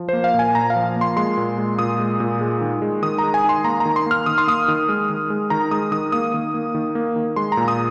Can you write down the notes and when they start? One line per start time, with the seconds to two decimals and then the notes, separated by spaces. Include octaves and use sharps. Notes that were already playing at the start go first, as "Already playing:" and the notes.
Already playing: F3
0.09 A#3 C5
0.24 F5
0.34 A#2 G#5
0.55 A#2 A#5
0.70 F5
0.76 F3
0.96 A#3
1.01 C6
1.16 G#3 C6
1.37 A#2
1.58 G#3
1.79 A#2 D#6
2.00 G#3
2.20 A#2
2.41 G#3
2.61 D#3
2.82 G#3
3.02 D#3 D#6
3.18 G#3 A#5
3.34 G#5
3.44 D#3 C6
3.64 A#3 A#5
3.80 A#5
3.85 D#3
3.96 C6
4.06 A#3 F6
4.26 D#3 D#6
4.38 C6
4.47 A#3 D#6
4.68 D#3
4.89 G#3
5.10 D#3
5.30 G#3
5.50 D#3 A#5
5.71 G#3 D#6
5.92 D#3 D#6
6.12 A#3 D#6
6.34 D#3
6.54 A#3
6.75 D#3
6.95 A#3
7.16 D#3
7.36 G#3 C6
7.52 A#5
7.57 A#2
7.68 D#6